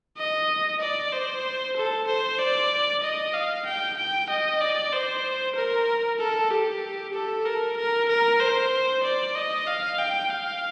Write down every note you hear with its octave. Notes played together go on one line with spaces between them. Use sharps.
D#5
D5
C5
A4
C5
D5
D#5
F5
G5
G5
D#5
D5
C5
A#4
A4
G4
A4
A#4
A#4
A#4
C5
D5
D#5
F5
G5
F5